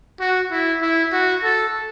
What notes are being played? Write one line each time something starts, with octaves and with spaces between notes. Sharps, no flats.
F#4
E4
E4
F#4
A4